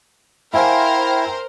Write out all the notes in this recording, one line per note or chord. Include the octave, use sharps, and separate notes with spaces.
E4 A#4 C5 E5 F5 G5 G#5